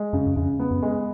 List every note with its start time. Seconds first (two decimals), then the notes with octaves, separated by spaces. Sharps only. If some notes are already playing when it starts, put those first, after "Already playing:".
Already playing: G#3
0.13 F#2 C#3
0.26 F#2
0.36 F2 C#3
0.60 B3
0.71 F#2
0.83 G#3